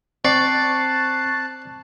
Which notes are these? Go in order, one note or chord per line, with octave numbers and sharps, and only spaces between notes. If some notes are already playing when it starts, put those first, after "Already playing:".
C4 D5 A5 C#6 F#6 A6 C7